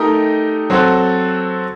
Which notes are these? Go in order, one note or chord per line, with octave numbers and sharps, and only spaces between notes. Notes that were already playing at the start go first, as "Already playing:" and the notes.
Already playing: A3 D#4 G4 A#4 D#5
F#3 C4 F#4 A4